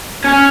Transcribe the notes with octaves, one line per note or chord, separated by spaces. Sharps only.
C#4